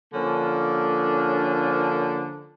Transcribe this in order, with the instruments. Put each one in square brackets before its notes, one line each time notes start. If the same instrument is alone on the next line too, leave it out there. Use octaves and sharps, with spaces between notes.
[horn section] D3 F3 A#3 C#4 D4